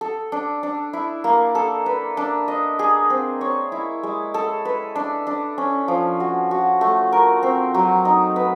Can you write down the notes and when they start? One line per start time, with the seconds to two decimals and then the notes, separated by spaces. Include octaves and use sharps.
0.01 A4
0.32 D4
0.63 D4
0.93 E4
1.24 A#3
1.55 A4
1.86 B4
2.17 D4
2.48 D#5
2.79 G#4
3.10 C4
3.41 C#5
3.72 E4
4.03 G#3
4.34 A4
4.65 B4
4.95 D4
5.27 D4
5.58 C#4
5.88 F3
6.20 F#4
6.51 F#4
6.81 A3
7.12 A#4
7.43 C4
7.74 F#3
8.05 D#4
8.36 B4